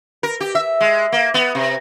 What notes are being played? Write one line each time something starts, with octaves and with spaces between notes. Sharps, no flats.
A#4
G4
E5
G#3
A#3
B3
C3